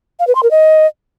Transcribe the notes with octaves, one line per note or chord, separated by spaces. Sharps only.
F5
B4
C6
A#4
D#5